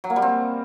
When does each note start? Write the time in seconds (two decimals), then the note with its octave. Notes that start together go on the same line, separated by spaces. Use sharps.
0.04 F#3
0.10 A#3
0.16 G3
0.22 C4